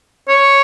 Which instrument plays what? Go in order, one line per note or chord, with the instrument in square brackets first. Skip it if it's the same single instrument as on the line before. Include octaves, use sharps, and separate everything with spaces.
[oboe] C#5